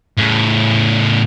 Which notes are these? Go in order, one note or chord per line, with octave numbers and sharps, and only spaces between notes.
A2 C#3